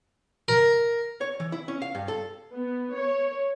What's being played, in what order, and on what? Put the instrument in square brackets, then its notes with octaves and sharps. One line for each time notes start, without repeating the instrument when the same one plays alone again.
[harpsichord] A#4
[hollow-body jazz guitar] C#5
E3
E4
C#4
F5
G2
A4
[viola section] B3
C#5